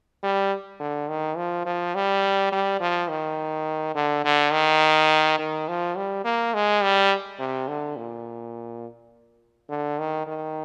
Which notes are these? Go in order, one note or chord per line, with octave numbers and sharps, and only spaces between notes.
G3
D3
D#3
F3
F3
G3
G3
F3
D#3
D3
D3
D#3
D#3
F3
G3
A#3
G#3
G3
C3
D3
A#2
D3
D#3
D#3